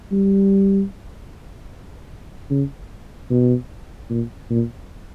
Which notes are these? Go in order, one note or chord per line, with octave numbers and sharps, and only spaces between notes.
G3
C#3
B2
A#2
A#2